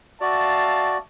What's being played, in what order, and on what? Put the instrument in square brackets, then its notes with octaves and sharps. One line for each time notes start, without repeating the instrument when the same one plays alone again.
[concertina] F#4 D5 [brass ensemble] E5 F5 A5